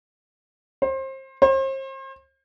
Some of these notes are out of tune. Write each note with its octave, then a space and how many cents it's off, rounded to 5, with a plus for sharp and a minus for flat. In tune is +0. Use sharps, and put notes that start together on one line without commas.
C5 +30
C5 +40